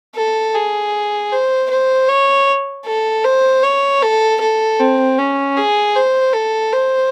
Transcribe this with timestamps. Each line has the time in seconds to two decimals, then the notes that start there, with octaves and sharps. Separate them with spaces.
0.15 A4
0.55 G#4
1.32 C5
1.70 C5
2.08 C#5
2.86 A4
3.24 C5
3.63 C#5
4.02 A4
4.41 A4
4.80 C4
5.18 C#4
5.57 G#4
5.96 C5
6.33 A4
6.73 C5